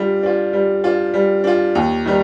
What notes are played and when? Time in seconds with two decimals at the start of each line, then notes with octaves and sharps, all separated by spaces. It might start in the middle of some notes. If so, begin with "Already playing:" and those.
Already playing: G3 D4 F4
0.23 D4 F4
0.53 G3
0.84 D4 F4
1.14 G3
1.44 D4 F4
1.75 D#2
2.06 D#3 G3